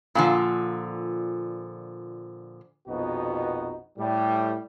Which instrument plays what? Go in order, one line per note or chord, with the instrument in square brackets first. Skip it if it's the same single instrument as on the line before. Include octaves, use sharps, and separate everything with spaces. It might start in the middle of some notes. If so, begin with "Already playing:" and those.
[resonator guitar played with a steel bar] A#2 D3 F3
[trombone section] A#1 F2 B2 B3 D#4 F#4
A2 G3